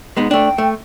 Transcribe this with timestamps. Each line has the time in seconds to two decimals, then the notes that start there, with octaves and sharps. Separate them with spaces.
0.17 G#3 B3 D#4
0.31 A3 D4 G5
0.58 A3